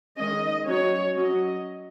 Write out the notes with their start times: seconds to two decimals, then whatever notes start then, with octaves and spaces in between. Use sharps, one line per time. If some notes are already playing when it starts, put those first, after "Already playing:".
0.18 D#3 G#3 C#4 D#5
0.67 F#3 C#4 C#5
1.17 F#3 C#4 D#5